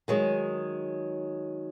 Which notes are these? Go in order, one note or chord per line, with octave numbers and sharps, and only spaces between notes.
D#3 F#3 G#3